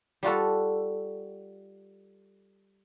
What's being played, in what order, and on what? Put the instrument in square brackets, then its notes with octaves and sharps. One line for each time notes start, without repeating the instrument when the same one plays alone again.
[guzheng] G3 F4 F#4 A4